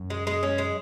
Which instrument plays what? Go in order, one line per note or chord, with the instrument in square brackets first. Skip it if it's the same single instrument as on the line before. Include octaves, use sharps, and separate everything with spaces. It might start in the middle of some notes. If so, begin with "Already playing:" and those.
Already playing: [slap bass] F#2
[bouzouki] G#3
G#3
C#4
G#3